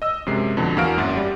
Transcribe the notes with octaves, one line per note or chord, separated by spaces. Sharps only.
D#5 E6
F#2 C3 G#3 C7
F2 B2 D3
E2 A#3 F#4 F5 F6 D7
G#1 F#2 F#5 A6
G3